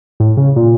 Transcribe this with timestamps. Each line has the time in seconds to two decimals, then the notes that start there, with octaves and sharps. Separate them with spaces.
0.20 A2
0.37 C#3
0.56 A#2